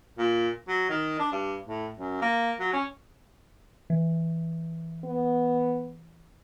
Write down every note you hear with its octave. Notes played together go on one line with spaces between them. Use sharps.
A#2
F#3
D#3
D4
G2
A2
F#2
A#3
F#3
C#4
E3
B3